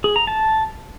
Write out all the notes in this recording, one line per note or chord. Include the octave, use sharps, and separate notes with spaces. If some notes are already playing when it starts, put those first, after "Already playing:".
G#4
A#5
A5